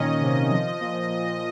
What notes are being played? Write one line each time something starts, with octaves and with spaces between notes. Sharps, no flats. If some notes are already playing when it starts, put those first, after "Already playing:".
Already playing: A#2 D#3 C#4 D#5
C3
F3
A#2
A#2